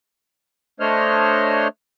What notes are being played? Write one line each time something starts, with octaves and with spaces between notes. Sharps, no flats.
A3 D4 C5 C#5 D#5 F6